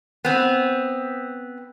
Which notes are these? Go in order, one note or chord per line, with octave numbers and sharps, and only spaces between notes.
B3 C4